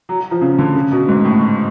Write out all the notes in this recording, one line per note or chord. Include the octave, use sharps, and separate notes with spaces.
F#3
F#3
F3
C#3
D3
C#3
B2
G#2
A2